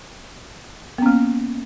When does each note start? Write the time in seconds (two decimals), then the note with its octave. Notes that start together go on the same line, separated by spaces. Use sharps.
0.98 B3
1.02 C#4
1.06 A#3